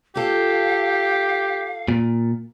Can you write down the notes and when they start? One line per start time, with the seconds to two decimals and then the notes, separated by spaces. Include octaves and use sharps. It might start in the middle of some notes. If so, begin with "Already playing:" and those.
0.16 F4 G4 A4 F5
1.88 A#2